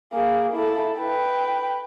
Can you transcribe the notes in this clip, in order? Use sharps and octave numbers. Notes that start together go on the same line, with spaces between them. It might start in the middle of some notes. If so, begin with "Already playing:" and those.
A#3 G#4
E4 A4
B4 G5